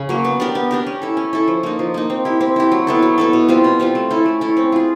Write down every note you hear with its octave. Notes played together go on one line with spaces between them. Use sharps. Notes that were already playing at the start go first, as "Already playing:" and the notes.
Already playing: C#3
F#3 A#3
B3
D4 G4 A#4
B3
D4 G4 A#4
C#4
E4 A4
C#4
E4 A4
F3
A#3 D#4
F3
A#3 D#4
C4
E4 G4
C4
E4 G4
F#3
B3 E4 A4
F#3
B3 E4 A4
B2
G3 C4 F4
B2
G3 C4 F4
A3
C#4 E4 A4
A3
C#4 E4 A4
C4
F4 G#4